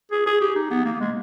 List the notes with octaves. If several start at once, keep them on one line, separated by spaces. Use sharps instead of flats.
G#4
G#4
G4
D#4
B3
A#3
G#3